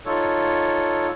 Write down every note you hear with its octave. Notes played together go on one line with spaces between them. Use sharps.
D#4 F4 A4 C#5